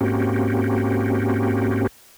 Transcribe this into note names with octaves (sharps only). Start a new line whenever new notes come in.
G#2 A#3 C4 C#4 F#4 G4